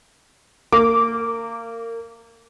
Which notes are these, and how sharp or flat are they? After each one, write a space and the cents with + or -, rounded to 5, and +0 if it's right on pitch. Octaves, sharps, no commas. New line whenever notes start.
A#3 -25 D6 -15